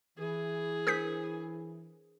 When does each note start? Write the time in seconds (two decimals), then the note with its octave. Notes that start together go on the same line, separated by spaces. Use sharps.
0.18 E3 G#4
0.87 D4 A#4 C5 D#6 G6 B6